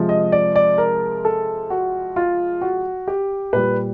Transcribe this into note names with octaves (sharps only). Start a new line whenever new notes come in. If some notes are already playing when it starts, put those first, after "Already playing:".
Already playing: C3 F3 G#3
D#5
D5
D5
A#4
A4
F#4
F4
F#4
G4
A#2 G3 B4